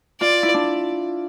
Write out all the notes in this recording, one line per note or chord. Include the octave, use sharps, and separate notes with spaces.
F4 D5
E4
D4